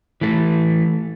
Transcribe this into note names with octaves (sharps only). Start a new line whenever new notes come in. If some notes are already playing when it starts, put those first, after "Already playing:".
E3 A3